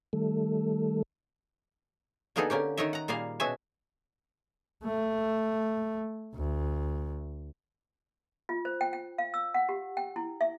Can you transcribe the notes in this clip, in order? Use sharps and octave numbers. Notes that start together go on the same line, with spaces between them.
D#3 G3 A3 A4
D3 A#3 B3 D#4 G#4 A4
D3 A#3 C#4 G4
D#3 D#4 C#5 D#5 E5
F#5 A#5
A#2 G3 A#3 G#4 F5
B2 C#4 F#4 G#4 E5 G#5
A3
D2
F4
C5
G5
G5
F5
E6
F#5
G4
G5
E4
E5